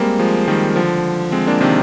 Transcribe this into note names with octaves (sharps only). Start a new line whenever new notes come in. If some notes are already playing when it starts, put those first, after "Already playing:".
Already playing: G3 G#3 A#3 C4
F3 G#3
D#3 G3
D3 F3
G#3 C4
A#3 D4
C3 D#3